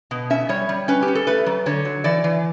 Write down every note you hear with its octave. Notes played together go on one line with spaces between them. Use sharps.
B2
C#4 E5
G3 C#5
G3
C#4 B4
G4
C#4
A4
A3 B4
F#3
D3 C#5
F#3
E3 D5
E3